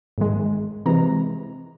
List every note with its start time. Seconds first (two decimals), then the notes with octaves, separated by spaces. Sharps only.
0.18 G#2 D#3 G#3
0.86 C3 E3 G#3 A#5